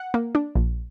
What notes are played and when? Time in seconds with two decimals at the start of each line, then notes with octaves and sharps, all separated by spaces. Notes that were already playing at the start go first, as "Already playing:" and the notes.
Already playing: F#5
0.14 A#3
0.35 D4
0.55 A#1